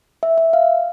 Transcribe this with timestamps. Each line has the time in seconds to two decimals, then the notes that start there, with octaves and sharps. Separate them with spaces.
0.23 E5
0.38 E5
0.53 F5